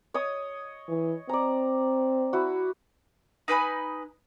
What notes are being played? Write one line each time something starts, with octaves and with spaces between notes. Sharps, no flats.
C#5 D#5 D#6
E3
C4 D5 A#5
E4 F#4
D#4 B4 G#5 B5